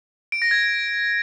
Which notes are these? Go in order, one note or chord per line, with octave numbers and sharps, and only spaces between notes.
D7
A#6
G#6